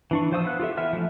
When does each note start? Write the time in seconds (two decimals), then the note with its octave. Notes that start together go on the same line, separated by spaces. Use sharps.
0.11 E3 D4 C#6
0.32 F3 C5 F5 D#6 E6
0.45 B3 F#6
0.60 F4 G4 A4 E5
0.77 E3 B3 E5 F6
0.93 F3 A3 D#4